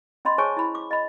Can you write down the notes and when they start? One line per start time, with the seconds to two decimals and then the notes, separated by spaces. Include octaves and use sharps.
0.25 C#4 D#5 B5 C6
0.38 G#4 C5 C#5 G#5 A5 C#6
0.57 E4 B5
0.75 D6
0.91 D#5 B5